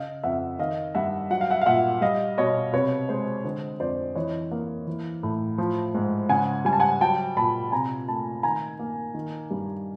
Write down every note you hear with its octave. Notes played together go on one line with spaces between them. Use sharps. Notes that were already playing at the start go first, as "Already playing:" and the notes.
Already playing: C#3 D#5 F5
F2 E5 F#5
D#3 D#5 F5
G2 E5 F#5
F#3 F#5
F5
E5 F#5
F5
A#2 E5 F#5
G3 D#5 F5
B2 C#5 D#5
C3 B4 C#5
G#3 C5
D3 C5
F2 C5 D5
E3 C#5 D#5
A#3
E3
A2
F3
G#2
C#3 F#5 G#5
G3 G#5
A5
F#5 G#5
F#3 G5 A5
A#2 A5 B5
C3 G#5 A#5
A3 A5 B5
D#3 G#5 A#5
A#3
D#3
G2